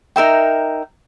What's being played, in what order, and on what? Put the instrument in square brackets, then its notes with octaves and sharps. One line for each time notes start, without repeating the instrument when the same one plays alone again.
[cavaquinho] D#4 A#4 E5 G5